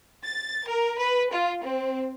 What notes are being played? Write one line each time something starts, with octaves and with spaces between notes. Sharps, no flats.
A6
A#4
B4
F4
C4